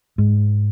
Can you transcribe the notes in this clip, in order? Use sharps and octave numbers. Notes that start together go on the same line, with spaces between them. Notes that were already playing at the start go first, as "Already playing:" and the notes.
G#2